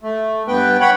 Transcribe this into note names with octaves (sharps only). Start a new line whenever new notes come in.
A3
G2 B3 B4 G5
C#5 F#5 G5 B5